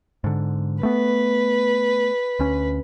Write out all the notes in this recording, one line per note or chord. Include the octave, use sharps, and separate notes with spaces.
G#2 D3
A3 B3 B4
D2 C#4